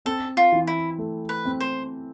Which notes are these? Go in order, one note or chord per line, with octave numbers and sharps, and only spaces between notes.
C4 A4
F4
E3
E4
A3
B4
C4
C5